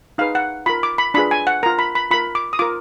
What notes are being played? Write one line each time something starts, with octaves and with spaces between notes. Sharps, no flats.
D#4 G#4 B4 F5
F#5
F4 A#4 B5
D6
B5
D4 F4 G#4 B4 B5
G#5
F#5
F4 A#4 A#5
B5
B5
F4 A#4 B5
D6
D#6
F4 A#4 D6